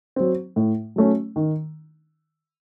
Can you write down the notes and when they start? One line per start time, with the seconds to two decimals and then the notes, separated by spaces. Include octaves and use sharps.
0.16 F#3 C4
0.56 A2
0.96 F#3 A3 C#4
1.36 D#3